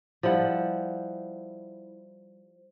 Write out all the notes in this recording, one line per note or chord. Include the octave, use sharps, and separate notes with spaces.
F3 G3 E4 F#5